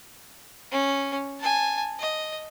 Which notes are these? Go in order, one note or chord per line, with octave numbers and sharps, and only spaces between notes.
C#4
G#5 A5
D#5